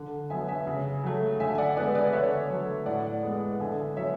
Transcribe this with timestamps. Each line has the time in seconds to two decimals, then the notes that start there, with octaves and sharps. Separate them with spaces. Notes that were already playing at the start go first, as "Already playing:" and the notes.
Already playing: D3
0.30 F#3 B3 E5 G#5
0.48 E5 G#5
0.67 C#3
1.03 F#3 A3
1.40 D3 E5 G#5
1.55 G#5
1.58 D5 F#5
1.77 G#3 B3 B4 D5
1.95 B4 D5
2.13 D3 C#5 E5
2.50 F#3 A3
2.86 A2 D5 F#5
3.23 G#3 B3
3.60 D3 E5 G#5
3.96 F#3 B3 C#5 E5